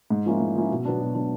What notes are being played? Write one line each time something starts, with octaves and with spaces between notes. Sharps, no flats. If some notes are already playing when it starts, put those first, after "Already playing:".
G#2
F3 A#3 C#4 E4
G#2
F3 A#3 C#4 E4
B2
F#3 B3 D4
B2
F#3 B3 D4